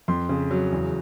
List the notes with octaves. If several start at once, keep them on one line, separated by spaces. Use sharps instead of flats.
F2 C6
C#3
F#3
E2